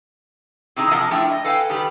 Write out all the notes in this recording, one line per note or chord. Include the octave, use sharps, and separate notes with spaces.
C3 E3 C4 D#4 G#4 A#5
F3 G#4 A#4 D#5 F#5 A5
F3 A3 D4 E4 E5 G5
D#5
A4 B4 F5 G5 G#5
D#3 G3 G4 B4